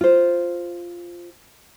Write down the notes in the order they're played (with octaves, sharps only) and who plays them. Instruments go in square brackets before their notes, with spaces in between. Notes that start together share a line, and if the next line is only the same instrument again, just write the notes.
[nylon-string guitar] F4 C5